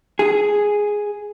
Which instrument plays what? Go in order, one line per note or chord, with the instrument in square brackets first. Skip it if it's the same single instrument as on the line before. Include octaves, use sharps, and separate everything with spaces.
[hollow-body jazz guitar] G#4